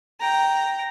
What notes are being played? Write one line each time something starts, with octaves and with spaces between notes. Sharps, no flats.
G5 A#5